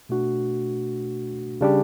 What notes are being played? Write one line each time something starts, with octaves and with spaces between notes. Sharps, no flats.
B2 A3 D4 F#4
C#3 G3 D4 G4